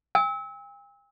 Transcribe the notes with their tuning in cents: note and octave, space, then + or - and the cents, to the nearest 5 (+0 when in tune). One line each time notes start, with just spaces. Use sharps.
G5 +45 E6 -30